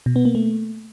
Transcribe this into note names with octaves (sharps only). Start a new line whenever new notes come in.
B2
B3
A#3
A3